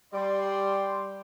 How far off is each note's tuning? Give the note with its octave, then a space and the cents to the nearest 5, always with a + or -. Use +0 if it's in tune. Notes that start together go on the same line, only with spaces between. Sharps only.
G3 +0 D5 +0 C6 +0